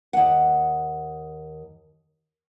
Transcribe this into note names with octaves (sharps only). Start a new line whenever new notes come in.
D#2 F#5